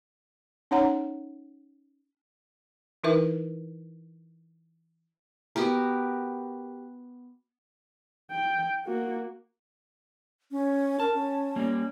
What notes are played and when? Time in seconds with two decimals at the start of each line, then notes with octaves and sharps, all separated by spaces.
0.71 C#4 D#4 C#5 F#5 A#5
3.04 E3 D#4 E4 A#4 B4 E5
5.56 B3 F#4 G4 A#4
8.31 G5
8.85 A#3 F#4
10.51 C#4
11.00 A#4 A5
11.14 C#4
11.56 G3 A#3